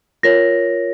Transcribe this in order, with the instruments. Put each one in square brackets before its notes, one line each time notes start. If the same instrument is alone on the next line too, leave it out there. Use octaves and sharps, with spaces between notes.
[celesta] F4 A#4 C#5 A#6